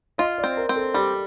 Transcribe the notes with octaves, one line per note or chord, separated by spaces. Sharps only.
F4 D#5
D5
C4
A#4
C4
A4
G3 G4